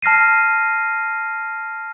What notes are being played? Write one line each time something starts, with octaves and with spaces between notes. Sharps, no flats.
A5 F6 A#6 C7 D#7